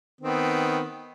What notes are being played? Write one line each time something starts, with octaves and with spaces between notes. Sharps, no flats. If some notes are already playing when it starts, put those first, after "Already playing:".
D#3 B3 C4